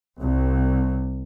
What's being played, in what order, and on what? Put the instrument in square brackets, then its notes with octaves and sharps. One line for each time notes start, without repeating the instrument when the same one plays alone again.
[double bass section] C2